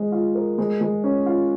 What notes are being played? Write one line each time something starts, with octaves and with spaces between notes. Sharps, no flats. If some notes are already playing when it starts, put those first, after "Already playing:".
Already playing: G#3 D#5
F4
A#4
G#3
G#3
C#4
F4